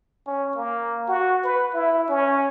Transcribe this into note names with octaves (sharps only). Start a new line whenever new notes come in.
C#4
A#3
F#4
B4
E4
C#4